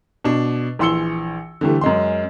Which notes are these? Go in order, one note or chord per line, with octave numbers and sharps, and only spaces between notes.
B2 D4
A#1 E3 C6 E6 C#7 G7
D3 E3 G3 A3
F#2 G#3 C6